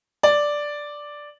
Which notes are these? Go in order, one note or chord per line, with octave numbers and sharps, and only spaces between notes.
D5